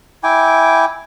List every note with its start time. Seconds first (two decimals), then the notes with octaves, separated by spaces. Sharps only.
0.24 E4 G5 G#5 D6